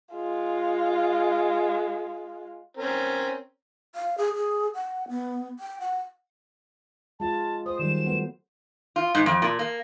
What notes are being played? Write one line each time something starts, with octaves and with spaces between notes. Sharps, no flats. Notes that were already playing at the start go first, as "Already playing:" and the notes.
G#3 F4
C4 C#4 A#4
F5
G#4
G#4
F#5
B3
G5
F#5
G#3 F4 A5
C5 D#6
D#3 F#3 G3 E7
A3 B3
F4
G#2
F2
A#2
A#3